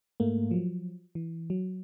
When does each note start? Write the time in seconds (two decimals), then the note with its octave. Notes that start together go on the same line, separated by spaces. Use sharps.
0.20 G#2 A3 A#3
0.51 F3 F#3
1.15 E3
1.50 F#3